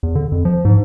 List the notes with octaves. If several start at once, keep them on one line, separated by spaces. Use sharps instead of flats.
E2
D3
F2
F3
G#2